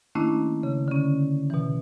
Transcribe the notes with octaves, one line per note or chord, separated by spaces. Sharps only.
D#3 A3 A#3 C#4 D4 E4
C#3
D3 C#4
B2 E3